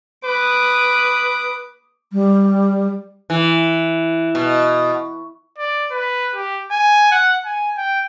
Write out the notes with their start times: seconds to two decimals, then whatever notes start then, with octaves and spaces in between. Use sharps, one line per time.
0.25 B4 D6 D#6
2.12 G3
3.30 E3
4.35 B2
5.58 D5
5.91 B4
6.35 G4
6.71 G#5
7.12 F#5
7.45 G#5
7.78 G5